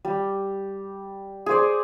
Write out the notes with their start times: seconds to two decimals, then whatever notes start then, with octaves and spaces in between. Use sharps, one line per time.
0.05 G3
1.46 G#4 C5 D5